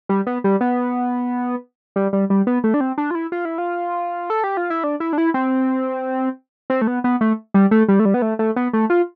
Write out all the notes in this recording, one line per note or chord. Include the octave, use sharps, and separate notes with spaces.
G3
B3
G3
B3
G3
G3
G3
B3
A3
D4
C4
D4
F4
E4
F4
E4
F4
A4
G4
F4
E4
D4
E4
D4
E4
C4
C4
A3
B3
B3
A3
G3
A3
G3
A3
G3
B3
A3
A3
B3
A3
F4